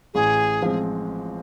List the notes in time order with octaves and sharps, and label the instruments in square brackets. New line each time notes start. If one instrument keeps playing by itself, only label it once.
[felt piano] A1 [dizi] G#4
[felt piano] F3 G#3 C4